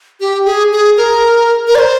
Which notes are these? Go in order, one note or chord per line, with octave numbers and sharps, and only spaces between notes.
G4
G#4
G#4
A#4
A#4
D5
C5